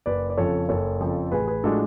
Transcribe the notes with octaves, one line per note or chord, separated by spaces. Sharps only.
F#1 B4 D5
D5
F2 C#3 F3 A4 C#5
F#1 A4 C#5
F2 C#3 F3
A1 G#4 B4
G#4 B4
A2 F3 G#3 D4 F#4 A4